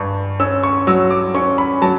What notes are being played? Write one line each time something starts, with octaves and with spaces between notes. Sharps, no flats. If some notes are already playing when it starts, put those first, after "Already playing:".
Already playing: G2 A5 C#6
C#4 E6
C#6
F#3 E6
D6
C#4 C#6
B5
F#3 A5